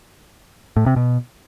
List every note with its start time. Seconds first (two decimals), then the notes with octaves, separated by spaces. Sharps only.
0.76 A2
0.86 C3
0.96 B2